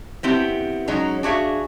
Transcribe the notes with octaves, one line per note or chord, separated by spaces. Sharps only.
B3 C4 E4 G4
F#3 G#3 C#4 D#4 G#4
D4 F#4 G#4 E5 F5